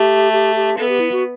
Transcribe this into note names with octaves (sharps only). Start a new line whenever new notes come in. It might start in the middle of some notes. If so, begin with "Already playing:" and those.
Already playing: A3 G4
G4
G4
B3 A4
G4
E4
F#4